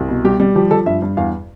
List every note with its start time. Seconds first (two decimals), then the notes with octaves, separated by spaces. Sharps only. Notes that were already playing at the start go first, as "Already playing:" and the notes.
Already playing: C2
0.09 B2
0.24 G3 G4
0.40 G3
0.55 F3 G4
0.71 F3 A4
0.86 G2 E5
1.02 G2
1.17 E2 F5